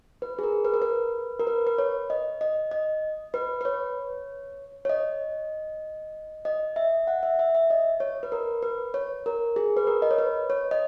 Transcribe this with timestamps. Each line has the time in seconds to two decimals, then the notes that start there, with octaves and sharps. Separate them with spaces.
0.22 B4
0.39 G#4
0.43 A#4
0.65 B4
0.74 A#4
0.82 B4
1.40 A#4
1.47 B4
1.67 B4
1.78 C#5
2.10 D#5
2.41 D#5
2.71 D#5
3.34 B4
3.61 B4
3.65 C#5
4.85 C#5
4.90 D#5
6.45 D#5
6.76 E5
7.07 F#5
7.23 E5
7.39 E5
7.55 E5
7.70 D#5
8.00 C#5
8.23 B4
8.32 A#4
8.63 B4
8.94 C#5
9.26 A#4
9.56 G#4
9.77 B4
9.87 A#4
10.02 D#5
10.11 C#5
10.18 B4
10.50 C#5
10.71 D#5